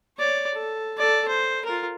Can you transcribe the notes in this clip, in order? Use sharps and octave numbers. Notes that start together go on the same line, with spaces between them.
C#5 D5
A4
A4 D5
C5
F4 A#4